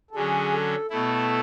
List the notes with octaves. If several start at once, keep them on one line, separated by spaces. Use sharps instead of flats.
A4
D3 F#3 C#4 G#4
A4
B2 A3 E4 A4